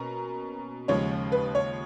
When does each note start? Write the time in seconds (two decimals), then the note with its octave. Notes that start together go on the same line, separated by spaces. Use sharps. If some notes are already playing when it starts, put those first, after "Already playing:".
Already playing: B2 A#3 C#4 A#5
0.88 D#2 C#3 F3 G#3 C#5
1.32 B4
1.55 C#5